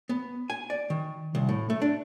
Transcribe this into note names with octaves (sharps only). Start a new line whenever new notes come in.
B3
G#5
D5
D#3
C2
A2
A3
D4